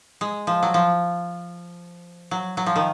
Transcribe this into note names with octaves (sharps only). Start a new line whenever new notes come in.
G#3
F3
F#3
F3
F#3
F#3
F3
D#3